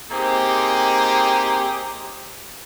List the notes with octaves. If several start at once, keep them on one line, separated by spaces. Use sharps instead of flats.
A#3 C4 D#4 G4 G#4